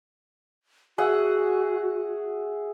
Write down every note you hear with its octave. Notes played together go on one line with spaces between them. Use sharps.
F#4 G#4 E5 F#5